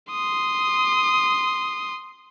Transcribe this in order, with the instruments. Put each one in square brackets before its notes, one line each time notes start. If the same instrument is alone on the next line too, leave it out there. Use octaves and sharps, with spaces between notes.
[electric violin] C6 D#6